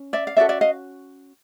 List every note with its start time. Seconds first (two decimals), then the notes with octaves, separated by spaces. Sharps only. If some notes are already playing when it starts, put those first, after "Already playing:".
Already playing: C#4
0.13 D5 E5
0.27 F5
0.37 C#4 F#4 A4 D5 E5
0.49 D5 E5
0.61 D#5 F5